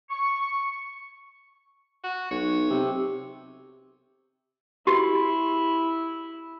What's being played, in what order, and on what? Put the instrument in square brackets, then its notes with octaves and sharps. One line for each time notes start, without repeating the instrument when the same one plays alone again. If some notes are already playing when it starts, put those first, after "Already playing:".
[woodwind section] C#6
[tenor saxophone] F#4
[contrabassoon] B1 [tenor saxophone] C#5
[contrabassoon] C3
[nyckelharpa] E4 [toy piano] F#4 G4